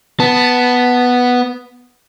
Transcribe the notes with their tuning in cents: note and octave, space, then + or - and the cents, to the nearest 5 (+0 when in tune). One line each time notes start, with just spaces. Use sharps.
B3 +0 A5 +0